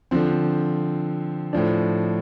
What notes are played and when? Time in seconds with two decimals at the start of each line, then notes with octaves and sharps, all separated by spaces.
0.11 D3 F3 C4
1.53 A2 F3 D4